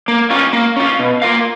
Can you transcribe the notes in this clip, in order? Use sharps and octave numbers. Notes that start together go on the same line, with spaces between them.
A#3
C#4 F4
A#3
C#4 F4
B2
A#3 F4 A#4 F5